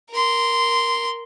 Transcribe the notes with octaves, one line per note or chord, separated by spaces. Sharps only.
A#4 C6